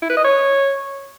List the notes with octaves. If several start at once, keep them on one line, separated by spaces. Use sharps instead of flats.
E4
B4
D#5
C#5